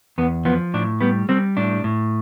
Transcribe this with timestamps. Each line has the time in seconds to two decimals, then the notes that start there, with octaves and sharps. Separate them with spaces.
0.18 E2 B3
0.45 F3 B3
0.74 A2 D4
1.01 G3 B3
1.29 G3 C4
1.57 A2 D4
1.84 A2